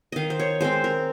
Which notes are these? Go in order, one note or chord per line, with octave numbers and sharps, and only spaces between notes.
D#3 D#5 F5
C5
C#5
G#3 C4 C5
A#4